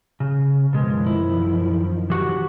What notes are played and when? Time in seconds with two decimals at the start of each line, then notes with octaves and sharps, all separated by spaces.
0.20 C#3
0.73 F#2 B2 D#3 F3 G#3
1.06 E4
2.10 E3 F#4 G4